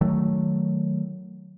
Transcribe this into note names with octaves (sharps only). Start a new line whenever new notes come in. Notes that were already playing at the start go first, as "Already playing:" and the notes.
D#3 F#3 A3